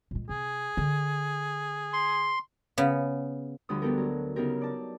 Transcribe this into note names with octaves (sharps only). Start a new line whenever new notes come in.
A#2 G#3
C3 G#4
D3
C6
C#3 B3
D2 D3 F3 G3 B5 D#6
G3 B3 G4 A4 A#4
F#3
C#3 F#3 B3 D#4 G4 A#4
D5 A5